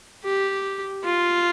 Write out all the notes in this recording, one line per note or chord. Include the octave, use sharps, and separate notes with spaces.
G4
F4